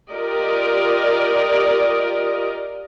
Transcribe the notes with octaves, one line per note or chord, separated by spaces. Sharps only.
F4 G4 A#4 D5 D#5